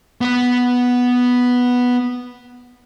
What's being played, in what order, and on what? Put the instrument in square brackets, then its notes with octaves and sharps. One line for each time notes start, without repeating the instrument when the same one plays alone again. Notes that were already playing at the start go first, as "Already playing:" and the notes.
[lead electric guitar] B3 B4